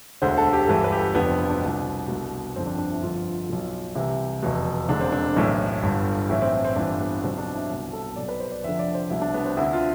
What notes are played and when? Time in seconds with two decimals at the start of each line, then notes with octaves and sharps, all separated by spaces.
0.22 E1 D2 D3 C5
0.37 A4
0.53 G4
0.67 G1 G2 E3 A4
0.84 B4
0.92 G4
0.99 A4
1.15 F1 F2 D3 B3
1.27 C4
1.38 F4
1.50 D4
1.62 C2 B2
2.08 C2 B2
2.56 G1 F2 D3 C4
2.66 D4
2.78 D4
2.91 E4
3.02 G1 F2 D3 F4
3.49 B1 B2
3.95 C2 C3 E3 E4
4.43 F1 E2 B2
4.89 E1 E2 D3 D4
5.01 C4
5.12 D4
5.36 B1 A2 E3
5.83 G1 G2 D3
6.29 B1 A2 E3 E4
6.42 C4
6.53 C4
6.65 C4
6.76 G1 G2 E3 D4
7.00 B3
7.23 B1 B2 C4
7.38 D4
7.54 E4
7.70 C2 B2
7.93 A4
8.16 B1 B2 D5
8.28 B4
8.40 C5
8.52 D5
8.64 F1 F2 D3 E5
8.79 D5
8.94 C5
9.10 C2 B2 E4
9.22 D4
9.34 B3
9.45 C4
9.57 D2 D3 E4
9.73 F4